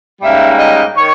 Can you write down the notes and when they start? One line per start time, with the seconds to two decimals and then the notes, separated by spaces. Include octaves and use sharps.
0.21 G#2 G3 A#3 C#4 E5
0.59 D#5
0.96 D#3 C#5